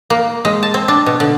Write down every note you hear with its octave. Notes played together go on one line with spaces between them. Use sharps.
A#3
G#3
A5
C4
D4
B2
D3